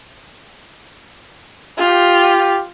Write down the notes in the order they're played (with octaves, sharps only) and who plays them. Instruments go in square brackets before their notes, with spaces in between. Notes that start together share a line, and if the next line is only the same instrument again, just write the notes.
[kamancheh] F4 [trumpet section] G4